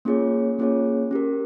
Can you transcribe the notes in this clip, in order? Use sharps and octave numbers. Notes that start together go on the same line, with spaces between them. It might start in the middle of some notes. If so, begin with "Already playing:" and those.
A#3 C#4 F4 G#4 C#5
A#3 C#4 F4 G#4 C#5
C#4 G4 A#4